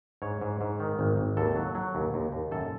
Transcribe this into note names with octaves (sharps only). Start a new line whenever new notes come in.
G#2 C#5
G#2
G#2
D#3
G#1
G#1
D#2 A4
F#3
F#3
D#2
D#2
D#2
F#2 A4